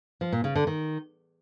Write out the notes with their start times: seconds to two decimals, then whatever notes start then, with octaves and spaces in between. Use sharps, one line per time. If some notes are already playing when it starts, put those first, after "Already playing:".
0.21 F3
0.32 A#2
0.44 C#3
0.55 D3
0.67 D#3